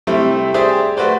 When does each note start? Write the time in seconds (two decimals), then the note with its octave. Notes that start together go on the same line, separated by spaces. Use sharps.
0.07 C3 G3 A3 C4 E4
0.54 G4 G#4 C5 D5 E5
0.97 A3 F#4 B4 C5 D5